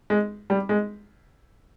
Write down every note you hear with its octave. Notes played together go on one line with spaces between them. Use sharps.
G#3
G3
G#3